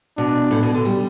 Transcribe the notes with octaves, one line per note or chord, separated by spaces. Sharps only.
B2 D4
A2
B2
D3
G3